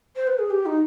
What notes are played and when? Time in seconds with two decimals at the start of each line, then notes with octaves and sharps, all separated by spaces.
0.16 C5
0.27 B4
0.39 G#4
0.50 G4
0.66 D#4